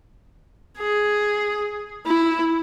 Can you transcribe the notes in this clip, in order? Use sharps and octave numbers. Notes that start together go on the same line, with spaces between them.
G#4
E4